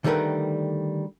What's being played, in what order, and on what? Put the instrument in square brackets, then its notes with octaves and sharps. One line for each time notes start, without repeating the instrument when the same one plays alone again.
[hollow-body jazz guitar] D3 D#3 G3 A3 A#4 B4